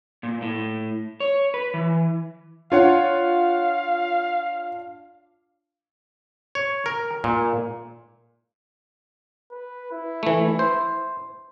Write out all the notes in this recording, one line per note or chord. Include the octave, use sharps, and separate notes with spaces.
A#2
A2
C#5
B4
E3
D4 F4 C#5 F5 F#5
C#5
A#4
A#2
B4
E4
E3 A3
C5